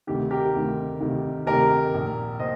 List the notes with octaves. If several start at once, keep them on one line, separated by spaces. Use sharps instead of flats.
D2 C3 D#3 G4
G4 A#4
D2 C3 D#3
D2 C3 D#3
D2 C3 D#3 G4 A#4
A#1 A#2
A#2 C5 D#5